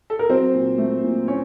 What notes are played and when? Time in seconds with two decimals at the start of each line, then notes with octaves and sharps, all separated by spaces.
0.10 A4
0.19 A#4
0.29 F#3 C4 C5
0.54 A#2
0.78 A3
1.04 A#2
1.28 A#2 C#4 C#5